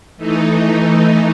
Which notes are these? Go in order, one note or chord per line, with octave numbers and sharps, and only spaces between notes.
E3 A3 D#4